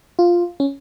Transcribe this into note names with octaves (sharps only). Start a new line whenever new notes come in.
F4
C#4